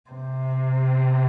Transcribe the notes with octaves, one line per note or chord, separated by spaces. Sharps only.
C3